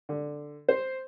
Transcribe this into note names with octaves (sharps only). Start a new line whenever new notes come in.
D3
C5